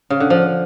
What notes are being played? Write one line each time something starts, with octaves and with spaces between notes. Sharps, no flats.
C#3
D3
F3